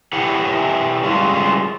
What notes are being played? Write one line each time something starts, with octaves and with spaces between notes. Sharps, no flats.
E4 G4 B4 C#5 F#5
G3 G#3 C#4 F4 F#4